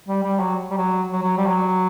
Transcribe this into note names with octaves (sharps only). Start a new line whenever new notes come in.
G3
G3
F#3
G3
F#3
F#3
F#3
G3
F#3